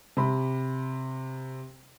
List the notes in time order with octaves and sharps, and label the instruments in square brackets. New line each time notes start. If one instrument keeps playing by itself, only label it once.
[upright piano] C3 B5